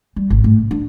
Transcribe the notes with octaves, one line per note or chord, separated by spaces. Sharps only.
G3
G#1
A2
C#3
D4